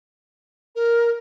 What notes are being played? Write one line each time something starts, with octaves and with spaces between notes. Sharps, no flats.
A#4